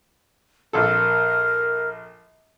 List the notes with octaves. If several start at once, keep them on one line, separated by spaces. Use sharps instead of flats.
A#1 A4 A#4